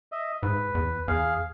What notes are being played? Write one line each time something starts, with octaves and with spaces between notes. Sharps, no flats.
D#5 E5
G#2 B4
E2
E2 G#4 F5